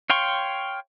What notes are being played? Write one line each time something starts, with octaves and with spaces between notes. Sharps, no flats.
C#5 F5 G5 C6 C#6